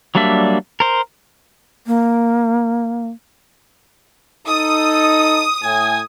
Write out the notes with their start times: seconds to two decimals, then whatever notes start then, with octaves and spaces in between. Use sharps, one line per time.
0.15 F#3 G3 A#3 D4 E5
0.80 A#4 C5
1.87 A#3
4.47 D#4 A4 D#6
5.63 A2 G#5